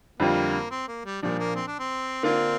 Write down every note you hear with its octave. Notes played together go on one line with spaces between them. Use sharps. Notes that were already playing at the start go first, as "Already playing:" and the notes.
F2 D3 G3 A#3 C4 F4
C4
A#3
G3
A#2 F3 G3 D4
A#3
C4
D4
C4
D3 A#3 C4 D4 F4